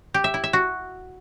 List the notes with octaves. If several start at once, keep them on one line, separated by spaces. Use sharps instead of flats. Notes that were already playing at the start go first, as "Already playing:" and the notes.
G4
E5
E4
E5
F#4